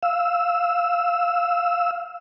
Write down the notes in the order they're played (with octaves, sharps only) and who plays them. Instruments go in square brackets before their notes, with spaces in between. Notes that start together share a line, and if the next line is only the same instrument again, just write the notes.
[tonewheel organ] F5 E6